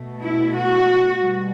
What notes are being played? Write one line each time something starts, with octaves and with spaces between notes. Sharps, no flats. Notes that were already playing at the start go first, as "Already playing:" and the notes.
Already playing: B2 A3
E4
F#4
B2 G3